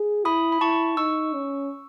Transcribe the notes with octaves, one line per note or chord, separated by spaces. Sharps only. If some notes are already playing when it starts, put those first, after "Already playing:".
Already playing: G#4
E4 B5 D#6
B5
E4 A5 C#6
D#4 C#6 E6
C#4